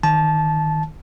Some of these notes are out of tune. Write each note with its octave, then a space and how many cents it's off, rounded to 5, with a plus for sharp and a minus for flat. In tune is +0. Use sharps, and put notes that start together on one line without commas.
D#3 +0 A5 -15